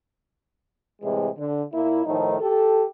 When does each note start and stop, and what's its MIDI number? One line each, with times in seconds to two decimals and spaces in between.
1.02 1.28 45
1.02 1.28 48
1.02 1.28 52
1.02 1.28 56
1.37 1.61 50
1.73 2.03 46
1.73 2.03 58
1.73 2.03 64
2.06 2.35 45
2.06 2.35 51
2.06 2.35 53
2.06 2.35 57
2.06 2.35 63
2.40 2.84 67
2.40 2.84 69